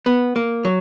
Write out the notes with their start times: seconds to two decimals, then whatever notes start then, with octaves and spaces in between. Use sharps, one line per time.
0.06 B3
0.36 A#3
0.65 F#3